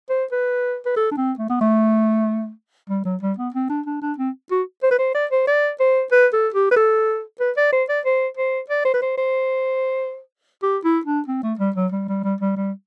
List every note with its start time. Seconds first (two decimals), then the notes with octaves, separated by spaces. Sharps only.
0.10 C5
0.32 B4
0.86 B4
0.97 A4
1.12 D4
1.17 C4
1.39 A3
1.50 B3
1.61 A3
2.89 G3
3.05 F#3
3.22 G3
3.38 B3
3.54 C4
3.70 D4
3.86 D4
4.02 D4
4.18 C4
4.51 F#4
4.83 C5
4.91 B4
4.99 C5
5.15 D5
5.31 C5
5.48 D5
5.80 C5
6.12 B4
6.33 A4
6.55 G4
6.71 B4
6.77 A4
7.40 B4
7.57 D5
7.73 C5
7.89 D5
8.05 C5
8.37 C5
8.70 D5
8.85 C5
8.94 B4
9.02 C5
9.18 C5
10.63 G4
10.84 E4
11.06 D4
11.28 C4
11.43 A3
11.59 G3
11.76 F#3
11.92 G3
12.09 G3
12.24 G3
12.41 G3
12.57 G3